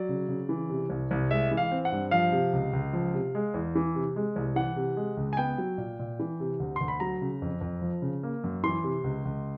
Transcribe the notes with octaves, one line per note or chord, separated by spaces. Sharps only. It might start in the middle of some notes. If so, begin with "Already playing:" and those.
Already playing: F#3 D5
C#3
C#3
E3
C3
C2
C2
G#3 E5
E3
F5
C4
F#5
G2
F3 F5
C3
C#2
C#2
F3
C3
G#3
E2
E3
C3
G#3
C2
E3 F#5
C3
G#3
C#2
G#5
B3 G5
F#3
A#2
A#2
E3
C3
D2
D2 C6
B5
F#3 A#5
C#3
F2
F2
F3
C#3
A#3
F#2
E3 C6
C3
C#2
C#2